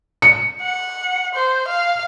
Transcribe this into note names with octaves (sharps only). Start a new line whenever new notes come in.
C#7
F#5
C5
F5